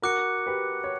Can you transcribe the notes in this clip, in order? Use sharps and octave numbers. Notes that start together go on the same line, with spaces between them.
F#4 A#4 D6 F#6 C#7
G4 B4
C#5